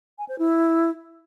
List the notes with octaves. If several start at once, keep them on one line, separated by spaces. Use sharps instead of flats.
G#5
C5
E4